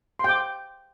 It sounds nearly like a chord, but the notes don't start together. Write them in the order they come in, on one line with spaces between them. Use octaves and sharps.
C6 G5 D6